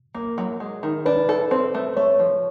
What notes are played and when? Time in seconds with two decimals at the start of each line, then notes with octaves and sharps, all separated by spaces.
0.15 A#3
0.38 F#3
0.60 G#3
0.83 D#3
1.06 D4 B4
1.29 A4
1.51 C4 C5
1.75 A3
1.97 A3 C#5
2.19 F3